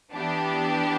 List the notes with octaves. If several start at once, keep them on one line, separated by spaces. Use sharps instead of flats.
E3 B3 D4 G4